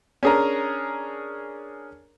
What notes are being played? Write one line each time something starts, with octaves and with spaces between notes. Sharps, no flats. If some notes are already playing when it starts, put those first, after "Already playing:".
C#4 D4 G#4 A#4 A#5